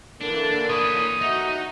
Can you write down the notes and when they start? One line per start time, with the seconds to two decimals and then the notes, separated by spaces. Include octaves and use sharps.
0.21 D3 E3 A#3 D4 A#4
0.69 B4 C#5 D#6
1.21 D#4 F#4 E5